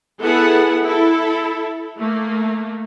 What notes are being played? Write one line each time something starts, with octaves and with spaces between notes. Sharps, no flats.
B3 E4 G#4 A4 F#5
E4 A4
A3 A#3